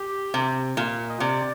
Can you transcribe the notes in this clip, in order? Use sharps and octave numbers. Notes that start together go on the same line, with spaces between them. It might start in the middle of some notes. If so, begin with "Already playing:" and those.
Already playing: G4
C3
A#2
D#5
C3 D5